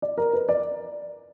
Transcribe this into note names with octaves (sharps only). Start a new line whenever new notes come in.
D5
A#4
B4
D5